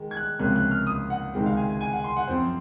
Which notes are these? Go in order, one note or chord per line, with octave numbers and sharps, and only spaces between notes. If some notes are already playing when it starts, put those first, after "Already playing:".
Already playing: D#3 G#3
G#6
F#6
C#2 C3 F3 A#3 C#4 F#6
F#6
F6
D#6
F#5
C#2 C3 D#3 G#3 C4
F5
G#5
G#5
G#5
F#5
C6
F#5
F#2 F3 C4 C5